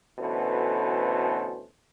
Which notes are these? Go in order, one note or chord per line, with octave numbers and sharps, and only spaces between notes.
D2 B2 E3 C#4 A4 C5